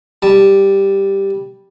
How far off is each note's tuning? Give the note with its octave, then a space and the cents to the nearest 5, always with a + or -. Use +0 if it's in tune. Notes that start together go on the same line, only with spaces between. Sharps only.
G3 +0 A5 +0